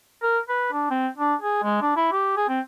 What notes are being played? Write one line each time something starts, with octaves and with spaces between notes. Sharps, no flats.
A#4
B4
D4
C4
D4
G#4
G#3
D4
E4
G4
G#4
C4